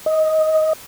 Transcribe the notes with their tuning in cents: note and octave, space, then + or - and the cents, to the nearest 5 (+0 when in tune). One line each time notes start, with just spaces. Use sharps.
D#5 +15